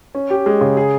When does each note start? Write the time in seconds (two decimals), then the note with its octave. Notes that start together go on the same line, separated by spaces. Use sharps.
0.15 C#4
0.30 G4
0.46 G#3
0.61 C#3
0.77 G#4